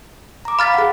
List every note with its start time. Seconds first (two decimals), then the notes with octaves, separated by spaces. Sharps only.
0.45 A#5 D6
0.59 F5 B5 F6 A6 B6
0.74 G#4 F#5